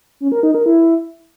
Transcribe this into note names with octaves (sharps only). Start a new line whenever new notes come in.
C#4
A#4
D#4
A#4
E4